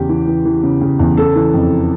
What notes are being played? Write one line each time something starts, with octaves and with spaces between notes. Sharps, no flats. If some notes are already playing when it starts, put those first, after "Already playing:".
Already playing: E2 C#3 G4
E3
E3
E3
C#3
C#3
E2
C#3 A4
E3
F2